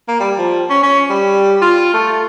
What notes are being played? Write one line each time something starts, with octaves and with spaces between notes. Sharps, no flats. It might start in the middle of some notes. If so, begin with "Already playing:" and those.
A#3
G3
F3
C#4
C#4
G3
F4
A3